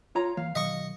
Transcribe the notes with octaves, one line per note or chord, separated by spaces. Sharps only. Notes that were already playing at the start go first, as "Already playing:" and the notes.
F4 C#5 A#5
E3 A#3 F5
B2 D#3 F#3 D#5 C#6